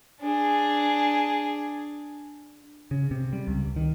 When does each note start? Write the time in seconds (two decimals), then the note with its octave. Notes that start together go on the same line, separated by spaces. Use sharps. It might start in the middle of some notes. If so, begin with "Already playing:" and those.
0.21 D4 G#4
2.91 C#3
3.11 C3
3.33 G3
3.48 C#2
3.76 D#3